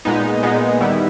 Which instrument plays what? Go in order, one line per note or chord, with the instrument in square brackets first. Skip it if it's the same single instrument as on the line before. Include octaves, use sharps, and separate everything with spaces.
[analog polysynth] A#2 G#3 B3 D#4
A#2 G#3 B3 D#4
D#3 G3 B3 E4